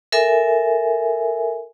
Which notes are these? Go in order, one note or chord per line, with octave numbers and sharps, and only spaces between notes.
A4 A#4 E5 G#5